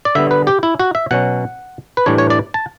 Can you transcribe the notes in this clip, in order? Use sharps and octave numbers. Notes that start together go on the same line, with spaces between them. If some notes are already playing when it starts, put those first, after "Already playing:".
D5
D3 G3 B3 E5
B4
G4
E4
F#4
E5
B2 F#3 C#4 F#5
B4
A2 E3 G3 D4 C#5
C#5
D5
A5